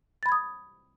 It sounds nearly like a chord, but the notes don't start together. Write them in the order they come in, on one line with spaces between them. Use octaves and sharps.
A6 B5 G#6 D#6